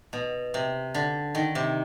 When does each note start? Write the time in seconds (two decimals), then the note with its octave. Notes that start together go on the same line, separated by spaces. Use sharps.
0.13 B2
0.54 C3
0.94 D3
1.35 D#3
1.55 C3